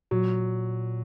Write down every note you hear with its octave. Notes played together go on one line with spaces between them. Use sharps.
A#2 F#3